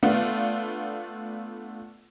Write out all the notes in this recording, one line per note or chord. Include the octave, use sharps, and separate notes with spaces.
A3 B3 D4 F4